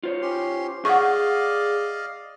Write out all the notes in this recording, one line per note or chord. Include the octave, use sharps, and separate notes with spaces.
F4 C5 C#5
C#4 G4 C6
G#4 D5 D#5 F5 F#5 C#6